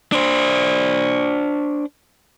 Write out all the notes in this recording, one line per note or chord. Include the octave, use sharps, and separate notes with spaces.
D4 C5